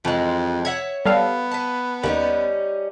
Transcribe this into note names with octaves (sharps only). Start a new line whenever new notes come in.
F2 E3 G#3
C#5 E5 F#5 G#6
G3 B3 A4 F5
B4 A5
D#2 G3 C#4 D#4